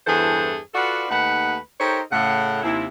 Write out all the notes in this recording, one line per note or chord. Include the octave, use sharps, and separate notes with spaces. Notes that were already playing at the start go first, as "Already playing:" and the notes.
E2 G2 E3 G#4 A4 C5
F4 F#4 A4 B4 D5 F#5
D#2 A3 D#4 B4 F#5
D#4 G4 A4 A#4 C5 C#5
A2 C#3 F#5
D#2 C3 E4